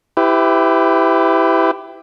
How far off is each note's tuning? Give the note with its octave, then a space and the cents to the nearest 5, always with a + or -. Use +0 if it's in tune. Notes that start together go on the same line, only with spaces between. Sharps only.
E4 +0 G4 +0 B4 +35